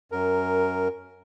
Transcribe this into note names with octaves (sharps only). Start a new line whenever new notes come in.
F#2 A#4